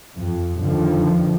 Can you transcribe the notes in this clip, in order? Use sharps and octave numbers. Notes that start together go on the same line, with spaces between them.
F2
F2 D3 D#3 F3